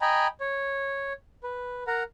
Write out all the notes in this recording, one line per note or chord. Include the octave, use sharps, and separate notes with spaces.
D#5 G5 G#5 A#5 B5
C#5
B4
A#4 F#5 A#5